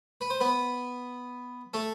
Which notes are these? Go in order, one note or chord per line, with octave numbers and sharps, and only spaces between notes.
B4
C5
B3 B4
A3 A4